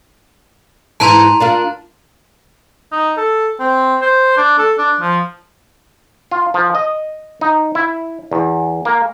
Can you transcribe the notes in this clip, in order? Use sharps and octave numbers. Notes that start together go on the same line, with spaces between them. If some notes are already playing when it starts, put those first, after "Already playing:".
G#2 E3 E4 A5 A#5 C6
D4 F4 A#4
D#4
A4
C4
C5
D4
A4
D4
F3
F4
F3
D#5
D#4
E4
E2
A#3